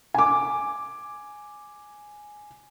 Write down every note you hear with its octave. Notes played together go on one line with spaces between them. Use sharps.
G#5 D6